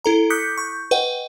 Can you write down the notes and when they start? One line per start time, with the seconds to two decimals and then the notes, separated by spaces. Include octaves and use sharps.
0.05 E4 A4 A#5
0.30 D6 D#6 F#6 G6 B6 C#7
0.58 C#6 G6
0.91 B4 D#5 F#5 G5